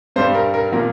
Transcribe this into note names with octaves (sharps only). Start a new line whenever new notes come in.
G2 G3 C5
A#4
A#4
A#2 F3 A#4